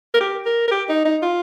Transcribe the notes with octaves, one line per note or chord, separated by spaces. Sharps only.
A#4
G4
A#4
A#4
G4
D#4
D#4
F4